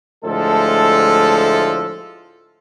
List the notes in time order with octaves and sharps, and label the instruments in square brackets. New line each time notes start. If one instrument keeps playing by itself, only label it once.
[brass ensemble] D2 A2 F3 G#3 A4